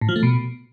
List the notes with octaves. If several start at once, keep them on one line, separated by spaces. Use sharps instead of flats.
A2
F3
A3
B2